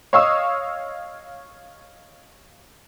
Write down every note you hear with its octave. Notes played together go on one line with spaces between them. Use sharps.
C#5 D#5 F5 C#6 D#6 E6